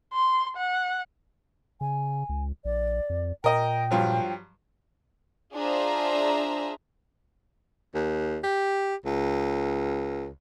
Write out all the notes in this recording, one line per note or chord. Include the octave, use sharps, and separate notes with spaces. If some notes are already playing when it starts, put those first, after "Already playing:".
C6
F#5
C#3 G#5
C#2
A#1 D5
F2
A#2 A#4 D#5 G5
G2 F3 F#3
D4 F4 G#4 C5 E5 A#5
D#2
G4
C#2